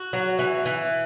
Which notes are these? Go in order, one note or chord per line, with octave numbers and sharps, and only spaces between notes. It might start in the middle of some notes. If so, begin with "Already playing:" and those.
Already playing: F#4
F#3
E3
E3